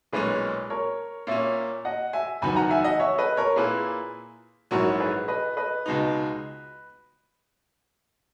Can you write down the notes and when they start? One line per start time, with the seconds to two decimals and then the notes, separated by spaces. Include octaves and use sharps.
0.12 B1 A#2 G#3 C#4 G#4 B4
0.70 A#4 C#5
1.27 A#2 A#3 C#4 C#5 E5
1.85 D#5 F#5
2.13 E5 G#5
2.42 F#1 E2 D#3 F#3 B3 G#5 B5
2.56 F#5 A#5
2.70 E5 G#5
2.84 D#5 F#5
3.00 C#5 E5
3.18 B4 D#5
3.37 A#4 C#5
3.56 A#2 A#3 E4 G#4 B4
4.71 A#1 G#2 F#3 C#4 E4 F#4 A#4
5.00 G#4 B4
5.28 B4 D#5
5.57 B4 D#5
5.86 C#2 B2 G#3 D#4